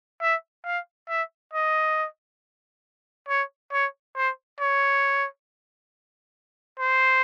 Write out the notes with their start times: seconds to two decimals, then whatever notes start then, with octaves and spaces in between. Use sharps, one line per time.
0.22 E5
0.65 F5
1.09 E5
1.53 D#5
3.29 C#5
3.72 C#5
4.16 C5
4.60 C#5
6.80 C5